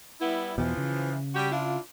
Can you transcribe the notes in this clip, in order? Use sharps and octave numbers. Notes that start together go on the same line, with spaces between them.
G3 B3 E4
E2 B2 E3 F3
C#3
G3 F#4 G4
D4 E4 F4